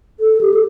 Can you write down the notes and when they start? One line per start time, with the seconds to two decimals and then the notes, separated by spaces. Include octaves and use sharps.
0.20 A4
0.41 G4
0.54 A4